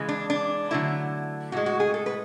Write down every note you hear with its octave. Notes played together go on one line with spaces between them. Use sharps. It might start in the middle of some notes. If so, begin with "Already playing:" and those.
Already playing: C#3 E3 G#3
D4
D4
D3 F#3 A3 E4
A2 G#3 F#4
F#4
G#4
A4
B4